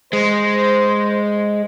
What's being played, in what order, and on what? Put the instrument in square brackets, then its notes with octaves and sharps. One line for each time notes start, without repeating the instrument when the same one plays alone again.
[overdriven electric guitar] G#3 [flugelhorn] C5